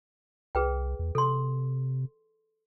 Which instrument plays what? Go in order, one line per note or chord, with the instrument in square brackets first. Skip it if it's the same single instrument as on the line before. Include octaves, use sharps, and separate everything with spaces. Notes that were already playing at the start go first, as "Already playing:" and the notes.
[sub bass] C2 [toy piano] G#4 B4 G5
[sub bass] E2
[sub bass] C3 [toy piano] A4 C6